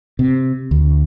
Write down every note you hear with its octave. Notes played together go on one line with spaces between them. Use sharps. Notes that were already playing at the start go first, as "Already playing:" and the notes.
C3
D2